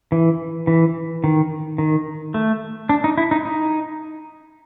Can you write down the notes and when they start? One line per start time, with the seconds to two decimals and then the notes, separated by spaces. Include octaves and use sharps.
0.12 E3
0.67 E3
1.24 D#3
1.78 D#3
2.34 A3
2.89 D4
3.04 D#4
3.18 E4
3.31 D#4
3.45 D#4